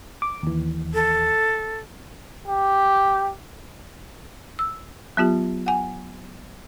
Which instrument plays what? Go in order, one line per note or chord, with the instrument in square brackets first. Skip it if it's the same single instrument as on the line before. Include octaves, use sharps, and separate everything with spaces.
[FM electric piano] D6
D#2 E3
[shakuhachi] A4
[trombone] G4
[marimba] E6
F#3 B3 F4 G4
F#5 G#5